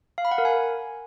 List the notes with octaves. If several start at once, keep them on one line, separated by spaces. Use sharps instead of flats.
F5
B5
F#5
A#4
G#5